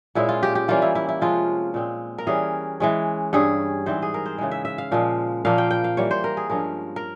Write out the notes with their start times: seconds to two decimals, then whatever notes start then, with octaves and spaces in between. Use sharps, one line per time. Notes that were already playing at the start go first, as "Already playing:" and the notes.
0.15 A#2 G#3 C#4 E4
0.29 F4
0.43 G4
0.55 G4
0.68 E3 G3 A#3 C#4 F4
0.82 E4
0.95 E4
1.09 E4
1.21 C3 F3 G#3 C#4 F4
1.74 A#2 G#3 C4
2.18 A#4
2.27 E3 G3 C#4 G#4
2.80 E3 G#3 C#4
3.33 G2 G3 C#4 G#4
3.86 G#2 E3 G3 C4 C5
4.02 G#4
4.14 A#4
4.26 C5
4.38 C#3 E3 G#3
4.51 E5
4.65 E5
4.78 F5
4.92 A#2 F3 G#3
5.45 A#2 F3 A#3 F5
5.58 G5
5.71 G5
5.84 F5
5.97 E3 G3 A#3 C#5
6.11 C5
6.24 A#4
6.37 G#4
6.50 G2 F3 G#3 C#4 A#4
6.96 A#4